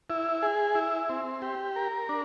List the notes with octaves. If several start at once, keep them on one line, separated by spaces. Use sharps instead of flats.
E4
G#4
E4
C4
G4
A#4
D4